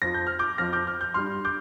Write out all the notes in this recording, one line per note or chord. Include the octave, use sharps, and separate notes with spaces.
F2 F3 A#6
G6
F6
D6 G6
F2 F3 F6 A#6
D6 G6
F6
G6
G2 G3 C6 F6
D6 G6